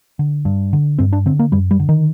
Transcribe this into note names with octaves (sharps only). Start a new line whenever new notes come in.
D3
G2
D3
G2 C4
D4
D3 C4
A#3
F#2 G3
G3
D3
D#3